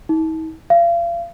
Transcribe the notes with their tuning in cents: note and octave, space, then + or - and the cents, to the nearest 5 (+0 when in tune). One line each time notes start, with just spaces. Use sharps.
D#4 +45
F5 -35